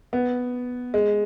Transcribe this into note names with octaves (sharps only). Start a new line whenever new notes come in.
B3
G#3